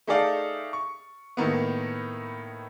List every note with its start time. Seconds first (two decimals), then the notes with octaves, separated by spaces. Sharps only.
0.07 A3 D#4 G#4 A4 D5 F5
0.73 C#6
1.37 A2 D#3 A#3 B3